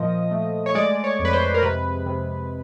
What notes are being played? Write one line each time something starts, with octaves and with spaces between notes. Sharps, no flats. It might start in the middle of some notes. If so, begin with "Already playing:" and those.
Already playing: A#2 F3 D#5
A3
C#5
G#3 D5
C#5
F2
B4
C5
A#4
C3 B4
C3